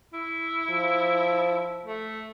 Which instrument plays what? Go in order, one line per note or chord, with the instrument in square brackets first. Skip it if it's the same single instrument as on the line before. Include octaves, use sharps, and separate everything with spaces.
[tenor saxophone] E4
[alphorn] F3
[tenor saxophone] A3